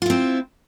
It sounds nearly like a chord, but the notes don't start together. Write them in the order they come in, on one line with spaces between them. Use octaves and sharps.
F4 E4 C4